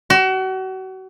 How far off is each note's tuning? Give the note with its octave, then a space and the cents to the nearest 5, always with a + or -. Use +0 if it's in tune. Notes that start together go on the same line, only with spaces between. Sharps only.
F#4 +35